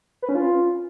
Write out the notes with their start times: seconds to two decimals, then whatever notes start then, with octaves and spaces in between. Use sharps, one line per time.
0.22 B4
0.29 C#4
0.35 F4